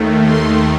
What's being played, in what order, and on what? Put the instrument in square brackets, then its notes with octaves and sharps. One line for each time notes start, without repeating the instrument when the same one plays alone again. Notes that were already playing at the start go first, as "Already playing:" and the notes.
Already playing: [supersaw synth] D#2 D#3 A3
C6